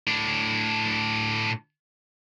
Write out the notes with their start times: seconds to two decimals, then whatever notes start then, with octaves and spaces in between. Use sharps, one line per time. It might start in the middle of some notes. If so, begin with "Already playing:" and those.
0.07 A2 D4